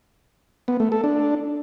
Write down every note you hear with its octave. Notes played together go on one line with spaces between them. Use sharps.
B3
A3
A4
D4